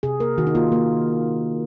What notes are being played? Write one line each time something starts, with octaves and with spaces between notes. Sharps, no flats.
C3 G#4
A#3 A#4
D#3 F#4
D#4
A#3 F4
A#3